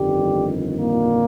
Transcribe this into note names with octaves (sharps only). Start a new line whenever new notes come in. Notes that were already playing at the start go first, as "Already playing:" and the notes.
Already playing: G1 F2 D#3 G3 G4
A#2 A#3